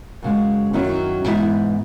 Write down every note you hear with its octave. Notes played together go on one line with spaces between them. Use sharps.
F#2 C#3 G#3
F#2 D#3 F#3 C#4 E4
G#2 E3 B3 E4